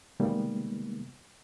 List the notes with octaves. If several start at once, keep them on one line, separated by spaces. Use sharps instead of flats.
C3 D#3 G3 G#3 A#3 B3